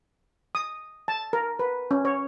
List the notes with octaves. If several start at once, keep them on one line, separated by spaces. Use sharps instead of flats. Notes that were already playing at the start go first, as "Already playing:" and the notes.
D#6
A5
A#4
B4
C#4
C#5